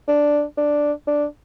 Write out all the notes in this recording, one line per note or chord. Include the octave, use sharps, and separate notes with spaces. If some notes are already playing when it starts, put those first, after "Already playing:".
D4
D4
D4